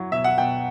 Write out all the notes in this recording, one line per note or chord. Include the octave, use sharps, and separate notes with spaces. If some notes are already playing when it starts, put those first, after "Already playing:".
Already playing: F#3 E4
B2 E5
F#5
B2 G5